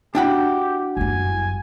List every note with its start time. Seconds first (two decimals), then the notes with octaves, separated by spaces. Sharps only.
0.15 D4 E4 F#4 G4 F#5 G5 B5
0.97 G1 F#2 G#5